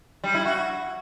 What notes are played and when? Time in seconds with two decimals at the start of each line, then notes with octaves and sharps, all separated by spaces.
0.24 G3
0.34 E4
0.45 F#4